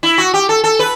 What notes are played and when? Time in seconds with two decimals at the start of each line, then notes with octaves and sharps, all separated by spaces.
0.03 E4
0.18 F#4
0.34 G4
0.49 A4
0.64 A4
0.79 B4